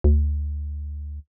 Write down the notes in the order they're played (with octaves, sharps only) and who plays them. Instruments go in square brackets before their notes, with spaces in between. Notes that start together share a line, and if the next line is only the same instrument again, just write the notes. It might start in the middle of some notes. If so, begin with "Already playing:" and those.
[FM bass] D2